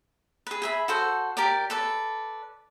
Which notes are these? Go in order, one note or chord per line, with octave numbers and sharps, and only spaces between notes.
G#4 B4
G#4 E5 B5
F#4 A4 C5 F#5
G4 A#4 D5
A4 B4 D5